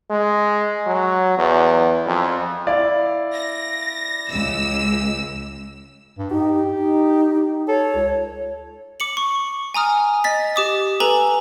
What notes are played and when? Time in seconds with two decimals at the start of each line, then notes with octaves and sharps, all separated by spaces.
0.10 G#3
0.86 F#3
1.38 E2
2.06 F2
2.67 E4 D5 F5
3.34 A#6
4.29 C#2 E6
6.18 G2
6.31 D#4 G4
6.78 D#4
7.68 A4 C#5
7.94 C#2
9.00 D6 C#7 F#7
9.17 C#6
9.74 G#5 A#5 D#6 F6
10.24 D#5 A6 B6
10.56 G4 D6 D#6
11.00 A4 B4 G#5 A#5 F#7